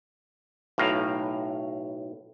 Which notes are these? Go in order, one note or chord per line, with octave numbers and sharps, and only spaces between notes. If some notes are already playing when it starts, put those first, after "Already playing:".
B1 A2 F5 A#5